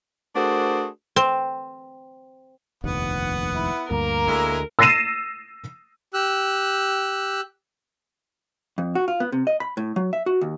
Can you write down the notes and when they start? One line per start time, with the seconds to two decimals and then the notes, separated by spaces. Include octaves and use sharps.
0.36 A3 D4 F#4 G#4 A#4 C5
1.16 C4
2.84 F1 A#1 D#2 B3 F#5
3.55 E4
3.91 D2 G2 A#3 A#4
4.28 D2 G#3 A3 E4 E5
4.79 E6 A6 A#6 C7 D#7 E7
6.14 G4 E6 F#6
8.78 F2
8.95 F#4
9.08 F4
9.20 B3
9.32 C3
9.47 D#5
9.60 B5
9.77 A2
9.96 F#3
10.13 E5
10.26 F#4
10.41 D#2